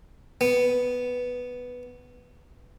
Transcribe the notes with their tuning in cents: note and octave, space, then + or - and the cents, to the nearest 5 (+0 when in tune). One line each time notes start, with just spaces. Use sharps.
B3 +0